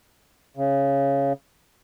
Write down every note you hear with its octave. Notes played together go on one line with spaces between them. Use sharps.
C#3